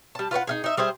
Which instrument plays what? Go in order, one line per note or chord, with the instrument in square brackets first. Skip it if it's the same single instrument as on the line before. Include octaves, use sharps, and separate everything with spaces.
[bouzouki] G3 A5
F4 B4 C#5 F#5
D#4 F4 G#4
D#4 E5
G3 G#4 C5 E5